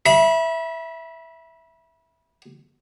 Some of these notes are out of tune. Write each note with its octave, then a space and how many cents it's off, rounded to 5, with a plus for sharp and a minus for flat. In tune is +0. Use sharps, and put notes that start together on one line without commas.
E5 +0 B5 -30